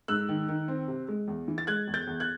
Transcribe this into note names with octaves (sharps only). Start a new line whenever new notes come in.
G#2 E6 F#6
D#3
D#3
C4
C3
G#3
E2
E3
A6
G#3 F#6 G#6
E2
G6 A6
E2
F#6 G#6